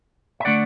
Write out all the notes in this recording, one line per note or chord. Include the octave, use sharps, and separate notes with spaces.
E5
D3 A3 D5 F#5